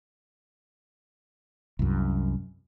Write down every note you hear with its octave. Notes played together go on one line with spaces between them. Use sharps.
C2 F#2